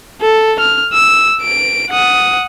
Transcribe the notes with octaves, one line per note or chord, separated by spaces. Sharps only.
A4
F6
E6
D7
F#5 D#6